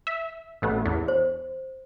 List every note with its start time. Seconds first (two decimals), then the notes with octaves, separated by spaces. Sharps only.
0.07 E5
0.62 A1 A3 B3
0.86 E2
1.08 C5